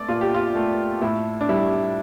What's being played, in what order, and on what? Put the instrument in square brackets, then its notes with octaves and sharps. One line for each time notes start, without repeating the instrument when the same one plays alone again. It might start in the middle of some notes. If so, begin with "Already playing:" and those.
Already playing: [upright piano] A3 D5
A#2 F4
G4
F4
A3
A2 E4
D4
G3 E4